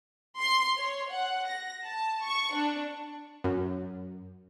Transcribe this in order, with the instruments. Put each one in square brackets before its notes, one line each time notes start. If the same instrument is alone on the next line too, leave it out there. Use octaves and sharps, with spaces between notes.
[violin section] C6
C#5
F#5
A#6
A5
C#6
D4
[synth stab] F#2